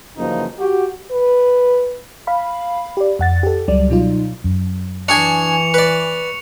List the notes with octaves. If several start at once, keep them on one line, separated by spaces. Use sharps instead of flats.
F#2 C#3 E3 F3 A#3 D#4
F#4 G4
B4
F5 B5
G4 D5
F2 F#5 A6
G4 A4
C#2 F#3 G3 D5
B2 F#3 D#4 F4
F#2
E3 D4 G#4 G#5 C#6 C#7 F7
B4 D5